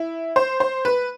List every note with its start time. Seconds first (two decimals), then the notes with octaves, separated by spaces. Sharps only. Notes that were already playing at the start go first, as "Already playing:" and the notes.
Already playing: E4
0.36 C5
0.60 C5
0.85 B4